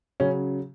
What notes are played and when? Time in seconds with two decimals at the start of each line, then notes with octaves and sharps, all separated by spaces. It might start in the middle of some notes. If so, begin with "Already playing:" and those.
0.20 C#3 F#3 C#4